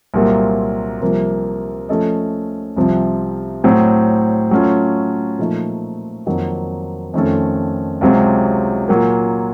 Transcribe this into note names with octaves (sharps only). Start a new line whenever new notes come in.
C2 A#2 F#3 A#3 F4
C2 C3 F3 A#3
F3 A3 C#4 A4 D#5
C2 C3 F3
A2 F#3 C4
F#3 A3 C#4 F4
A#2 F3 A3 D#4
F2 D#3 F#3 A#3 D#4
F2 D#3 A3 C#4 A4
C#2 C3 F#3 C4
A#2 F#3 A#3